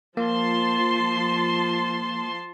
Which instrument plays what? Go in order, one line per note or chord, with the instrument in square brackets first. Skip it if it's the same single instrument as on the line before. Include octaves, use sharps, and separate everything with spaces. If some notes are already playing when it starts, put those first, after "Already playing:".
[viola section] F3 A5 C6 [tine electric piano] A#3